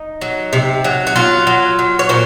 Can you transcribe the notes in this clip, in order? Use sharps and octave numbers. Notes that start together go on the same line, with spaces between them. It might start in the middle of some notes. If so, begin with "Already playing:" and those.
Already playing: D#4
F#3
C3
F#3
F#4
F#3 F4
F#3
F#3
C#5
A#2 C5